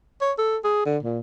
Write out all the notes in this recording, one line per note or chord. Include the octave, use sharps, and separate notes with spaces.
C#5
A4
G#4
D3
A#2